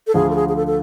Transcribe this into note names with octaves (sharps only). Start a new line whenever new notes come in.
A4
D2 D3 F3 G#4
A4
G#4
G#4
A4
A4